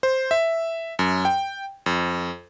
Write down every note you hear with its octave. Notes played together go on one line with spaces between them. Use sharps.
C5
E5
F#2
G5
F2